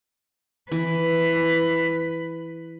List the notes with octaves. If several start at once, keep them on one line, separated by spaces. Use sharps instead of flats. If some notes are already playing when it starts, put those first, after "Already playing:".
E3 B4